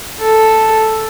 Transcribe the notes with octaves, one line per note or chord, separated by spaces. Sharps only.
A4